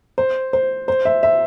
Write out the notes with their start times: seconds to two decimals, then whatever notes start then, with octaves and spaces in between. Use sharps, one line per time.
0.18 C5
0.53 C5
0.88 C5
1.05 E5
1.23 E5